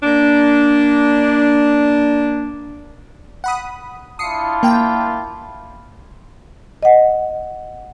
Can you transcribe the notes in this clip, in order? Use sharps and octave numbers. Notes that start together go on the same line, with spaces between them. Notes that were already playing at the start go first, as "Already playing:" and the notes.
A#3 D4
F#5 B5 D#6
D4 E4 F4 D#6 C7 C#7
A#3 G5
D#5 F#5